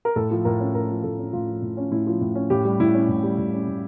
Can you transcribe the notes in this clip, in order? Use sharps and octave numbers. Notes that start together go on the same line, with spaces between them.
A#4
A2 A4
F3
A2 A#4
C#4
A2 A#4
F3
A2 A4
C#4
A2 F4
F3
A2
C#4
A2 E4
F3
A2
C#4
A2 G4
G3
A2 E4
C#4
A2
G3
A2
C#4
A2